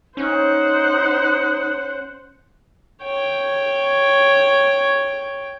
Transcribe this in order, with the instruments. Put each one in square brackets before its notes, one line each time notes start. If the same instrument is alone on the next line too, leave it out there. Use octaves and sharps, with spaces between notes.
[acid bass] C#4 [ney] D#4 [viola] C5 F#5
[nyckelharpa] C#5 G5